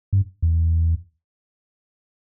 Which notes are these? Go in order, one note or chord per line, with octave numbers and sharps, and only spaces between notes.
G2
E2